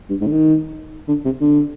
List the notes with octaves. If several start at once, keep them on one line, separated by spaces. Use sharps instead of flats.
G2
G#2
D3
D#3
D3
C3
D3